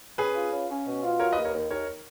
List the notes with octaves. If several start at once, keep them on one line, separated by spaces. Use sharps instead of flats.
C#4 G#4 B4
F4
C#4
C#4
B2
F4
F#3 A#4 C#5
B4 D#5
D#2
A#4 C#5
D#2
D#2 A#4 C#5